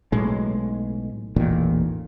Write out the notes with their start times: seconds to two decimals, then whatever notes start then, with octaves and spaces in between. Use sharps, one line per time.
0.12 B1 A2 G#3
1.36 E1 A1 A#2 D#3